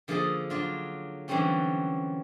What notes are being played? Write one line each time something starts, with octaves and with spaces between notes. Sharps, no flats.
D3 F3 A#3 G#4 A4 D#5
F#3 D4 F4
D3 E3 F#3 G3 C4 C#4